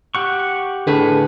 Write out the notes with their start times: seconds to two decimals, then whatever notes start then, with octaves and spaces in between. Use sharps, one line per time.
0.15 G4 F#5 C#6
0.87 A2 D3 G#4 B4